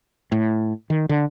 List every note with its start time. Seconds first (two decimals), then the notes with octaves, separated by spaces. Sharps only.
0.32 A2
0.90 D#3
1.09 D3